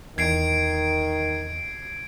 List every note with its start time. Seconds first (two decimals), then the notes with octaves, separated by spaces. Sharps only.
0.18 E2 D#3 G#6 C7 D7